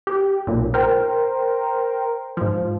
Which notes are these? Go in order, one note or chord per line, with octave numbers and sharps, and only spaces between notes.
G4
B1 A#2
A#4 C5 G5
G#2 F3